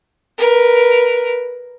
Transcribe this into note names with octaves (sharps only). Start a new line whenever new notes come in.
A#4 B4